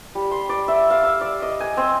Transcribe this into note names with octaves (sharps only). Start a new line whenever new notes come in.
G3
C6
D5
E5
F5
E6
D5
D#5
G#5
C4